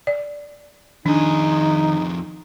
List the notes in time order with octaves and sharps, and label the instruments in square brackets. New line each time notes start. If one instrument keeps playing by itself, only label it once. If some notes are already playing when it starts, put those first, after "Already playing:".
[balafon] D5
[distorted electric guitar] F2 G#4 [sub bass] D#3 [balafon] D4 [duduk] D#4